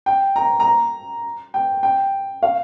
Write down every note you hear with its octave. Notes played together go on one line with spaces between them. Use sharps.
G5
A#5
A#5
G5
G5
F5